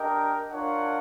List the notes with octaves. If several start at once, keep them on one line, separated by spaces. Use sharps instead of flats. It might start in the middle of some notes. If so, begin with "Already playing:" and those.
Already playing: D4 G4 A#4 D#5 G5
D4 F4 A#4 C#5 F#5